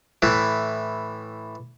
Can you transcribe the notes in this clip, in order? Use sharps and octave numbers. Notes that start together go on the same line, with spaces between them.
A2 E3